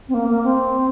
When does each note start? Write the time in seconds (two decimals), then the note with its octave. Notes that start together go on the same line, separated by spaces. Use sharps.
0.08 C4
0.14 A#3
0.28 A#3
0.43 C4